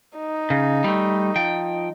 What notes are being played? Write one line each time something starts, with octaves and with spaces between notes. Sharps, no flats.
D#4
C#3
G3 A3
F3 G5